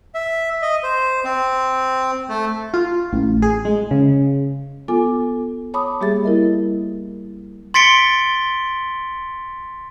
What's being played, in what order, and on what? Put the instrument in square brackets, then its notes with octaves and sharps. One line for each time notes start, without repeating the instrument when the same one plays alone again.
[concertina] E5
D#5
C5
C4
A3
[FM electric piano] F4
A1
G#4
G#3
C#3
[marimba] B3 F4 A4 G#5 D6
C#5 A5 B5 D6 D#6
G3 A#3 G4 G#4 E5 A6
E4 A#4 D#5
[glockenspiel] C6 A6 B6 C#7 D7 G7